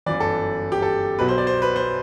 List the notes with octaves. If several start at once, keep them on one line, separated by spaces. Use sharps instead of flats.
G1 F#2 E3 D5
A4
G4
A4
B1 B2 F#3 B4
C5
D5
C5
B4
C5